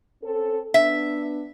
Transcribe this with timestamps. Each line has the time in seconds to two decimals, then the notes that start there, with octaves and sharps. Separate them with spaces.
0.22 C4 C#4 A4
0.74 B3 D4 E5